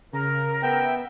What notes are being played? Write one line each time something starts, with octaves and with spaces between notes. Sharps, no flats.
C#3 A#4
B3 E5 G5